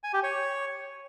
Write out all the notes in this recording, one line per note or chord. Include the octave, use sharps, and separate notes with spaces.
G#5
G4
C#5